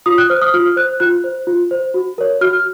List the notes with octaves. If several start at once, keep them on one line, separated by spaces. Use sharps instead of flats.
F4 D#6
F#6
C5 F6
D#6
F4 F6
C5 F#6
F4 F#6
C5
F4
C5
F#4
A#4 C#5
F#4 F6